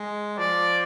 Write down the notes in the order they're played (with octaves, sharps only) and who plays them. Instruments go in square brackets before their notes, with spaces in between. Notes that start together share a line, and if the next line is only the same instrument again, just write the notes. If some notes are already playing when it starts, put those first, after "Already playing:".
Already playing: [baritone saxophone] G#3
[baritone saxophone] F3 [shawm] D5